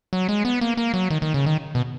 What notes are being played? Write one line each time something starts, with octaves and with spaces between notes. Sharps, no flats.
F#3
G#3
B3
A#3
A#3
F#3
D#3
D#3
C#3
D#3
B2